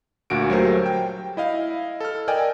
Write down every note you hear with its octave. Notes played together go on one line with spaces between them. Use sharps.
D2 A#2 F#4 D7
F#3 G3 A3 G4 A#4 C5
G5
E4 D#5 F5
A4 F6
A#4 D5 D#5 G5 G#5